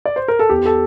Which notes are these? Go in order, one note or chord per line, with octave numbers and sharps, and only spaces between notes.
D5
C5
A#4
A4
E2 G4
A4